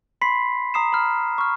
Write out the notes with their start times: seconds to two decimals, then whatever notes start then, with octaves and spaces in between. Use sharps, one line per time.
0.22 B5 C6 B6 C7
0.74 A#5 D#6 C7 E7
0.93 B5 F6
1.38 C#6 F6